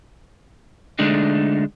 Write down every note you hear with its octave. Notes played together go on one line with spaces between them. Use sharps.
D3 G#3 A3 D4 D#4